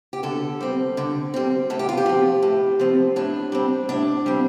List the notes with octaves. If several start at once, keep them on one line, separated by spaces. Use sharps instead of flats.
G4
D3 A4
G3 C4
D3
G3 C4
A2 A4
G4
F4
G4
F3 C4
A2
F3 C4
A2 D4
G3 C4
A2 D4
G3 C4